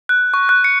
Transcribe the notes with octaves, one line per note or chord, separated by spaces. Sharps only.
F#6
C#6
F#6
C#7